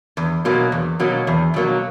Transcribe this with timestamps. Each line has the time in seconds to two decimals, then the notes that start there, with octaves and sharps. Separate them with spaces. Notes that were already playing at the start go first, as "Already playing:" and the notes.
0.17 E2
0.45 B2 F#3 A#3
0.72 E2
1.00 B2 F#3 A#3
1.27 E2
1.54 B2 F#3 A#3